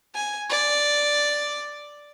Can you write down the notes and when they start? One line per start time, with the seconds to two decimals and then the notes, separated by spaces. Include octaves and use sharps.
0.15 G#5
0.50 D5